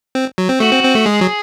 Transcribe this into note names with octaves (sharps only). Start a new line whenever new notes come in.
C4
F#3
C4
A3 F#4
C4
C4
A3
G#3 G#4
F#3